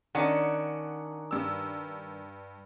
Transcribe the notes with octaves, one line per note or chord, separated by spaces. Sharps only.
D#3 C#4 D4 F#5
G2 E6